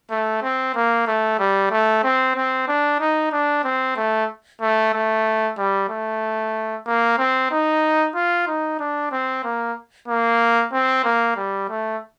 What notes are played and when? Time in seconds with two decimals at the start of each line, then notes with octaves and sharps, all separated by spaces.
0.11 A3
0.42 C4
0.75 A#3
1.07 A3
1.39 G3
1.71 A3
2.04 C4
2.36 C4
2.68 D4
3.00 D#4
3.32 D4
3.64 C4
3.97 A3
4.61 A3
4.94 A3
5.58 G3
5.89 A3
6.86 A#3
7.18 C4
7.51 D#4
8.15 F4
8.47 D#4
8.80 D4
9.12 C4
9.44 A#3
10.08 A#3
10.73 C4
11.04 A#3
11.37 G3
11.69 A3